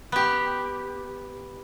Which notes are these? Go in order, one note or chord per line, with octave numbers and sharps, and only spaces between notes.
B3 G4